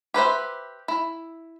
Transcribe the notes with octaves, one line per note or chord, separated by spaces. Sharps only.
G4 B4 C5 E5
E4